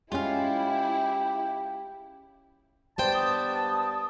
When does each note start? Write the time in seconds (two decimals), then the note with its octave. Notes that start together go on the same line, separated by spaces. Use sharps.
0.12 G#3 C#4 E4 F4 G4 F5
2.98 G2 B3 C5 D5 G5 A5
3.14 D#6